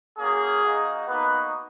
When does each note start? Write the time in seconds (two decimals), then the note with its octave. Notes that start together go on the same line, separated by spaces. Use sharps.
0.18 A#3 C#4 F#4 G#4
0.62 A#3 D#4 F#4
1.07 A#3 B3 D#4 F#4 B4